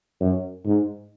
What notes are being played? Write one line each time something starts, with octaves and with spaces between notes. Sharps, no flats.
F#2
G#2